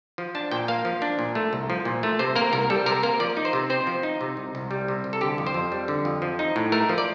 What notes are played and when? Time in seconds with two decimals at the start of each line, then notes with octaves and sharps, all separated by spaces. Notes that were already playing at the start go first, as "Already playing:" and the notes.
0.18 F3
0.35 D4 A5
0.51 A#2 G5
0.68 A#3 F5
0.85 F3
1.02 D4
1.19 A#2
1.35 A3
1.53 C2
1.70 F3
1.85 A#2
2.03 A3
2.19 C3 C5
2.36 A#3 A#4
2.53 C2 A#4
2.70 G3 A4
2.86 C3 A#4
3.03 A#3 A#4
3.20 F3 D5
3.37 D#4
3.45 C5
3.53 C3
3.70 C4 C5
3.87 F3
4.03 D#4
4.21 C3
4.37 C2
4.55 C2
4.71 G3
4.88 C3
5.04 C2
5.13 A4
5.21 D3 G4
5.38 F2
5.47 C5
5.54 F2
5.72 G3
5.88 D3
6.05 F2
6.22 F3
6.39 D#4
6.56 A2
6.72 A3 A#4
6.89 F3
6.98 D5